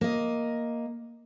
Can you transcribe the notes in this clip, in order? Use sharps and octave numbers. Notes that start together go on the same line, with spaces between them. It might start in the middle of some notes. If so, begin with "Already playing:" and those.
A#3 D#5